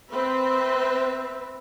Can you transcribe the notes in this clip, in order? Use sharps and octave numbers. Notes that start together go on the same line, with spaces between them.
C4 B4 E5